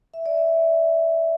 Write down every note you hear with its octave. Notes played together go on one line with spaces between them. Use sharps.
E5
D5
E5